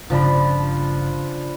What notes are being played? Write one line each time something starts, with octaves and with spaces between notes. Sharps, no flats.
G1 C#3 F3 D4 B5